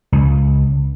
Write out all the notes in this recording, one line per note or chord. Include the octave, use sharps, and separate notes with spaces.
C#2